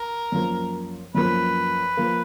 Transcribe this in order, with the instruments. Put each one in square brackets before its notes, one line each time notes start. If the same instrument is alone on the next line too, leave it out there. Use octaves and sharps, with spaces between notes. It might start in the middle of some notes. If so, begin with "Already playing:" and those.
Already playing: [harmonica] A#4
[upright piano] F#2 F3 A#3
[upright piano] F#2 F3 A#3 [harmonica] B4
[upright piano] F3 A#3